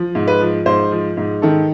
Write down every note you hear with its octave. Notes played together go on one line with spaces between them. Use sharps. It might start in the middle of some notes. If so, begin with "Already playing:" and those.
Already playing: F3
G#2
B4
F3
G#2 C5
F3
G#2
D#3 A4